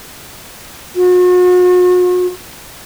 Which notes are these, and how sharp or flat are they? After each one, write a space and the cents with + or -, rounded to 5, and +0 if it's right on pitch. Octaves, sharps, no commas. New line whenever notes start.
F#4 -40